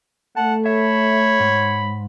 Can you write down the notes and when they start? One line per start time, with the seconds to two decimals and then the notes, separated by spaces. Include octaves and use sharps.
0.37 A3 F#5 A5
0.66 C#5 E5 B5
1.40 G#2